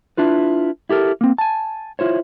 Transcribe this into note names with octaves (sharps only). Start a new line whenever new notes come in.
D4 E4 F4 B4
E4 G4 A4 A#4
A#3 C4
G#5 A5
E4 F4 C5 C#5